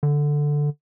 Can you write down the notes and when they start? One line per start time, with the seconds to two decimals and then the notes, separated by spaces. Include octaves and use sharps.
0.03 D3